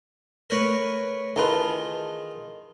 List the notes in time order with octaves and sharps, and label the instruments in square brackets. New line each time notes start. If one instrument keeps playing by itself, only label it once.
[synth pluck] A3 F#6 D#7 [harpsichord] A#4 B4 C#5
[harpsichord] D#3 F4 [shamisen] E3 A#4 B4 [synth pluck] G#4 A5